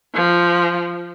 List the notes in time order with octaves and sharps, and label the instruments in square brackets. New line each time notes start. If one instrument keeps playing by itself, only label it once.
[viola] F3